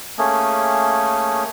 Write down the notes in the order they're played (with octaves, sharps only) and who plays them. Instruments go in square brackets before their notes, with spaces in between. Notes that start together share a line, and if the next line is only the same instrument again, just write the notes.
[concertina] A3 A#3 C#4 G#4